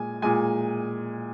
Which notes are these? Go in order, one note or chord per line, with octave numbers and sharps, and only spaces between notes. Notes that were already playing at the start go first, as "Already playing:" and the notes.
Already playing: A#2 G#3 G#5
A#2 G#3 G#5